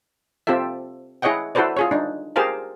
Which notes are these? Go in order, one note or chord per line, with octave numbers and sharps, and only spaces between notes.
C4 F4 G4 A4 E5
E4 G#4 C#5 D#5 F#5 G5
E4 F#4 A4 B4 C5 D5
F4 G#4 C#5
D4 D#4
G4 G#4 A#4 C5 F5 A5